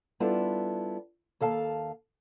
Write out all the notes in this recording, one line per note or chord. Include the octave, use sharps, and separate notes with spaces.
G3 B3 D4 E4 F4 A4
D#2 A4 F5 A5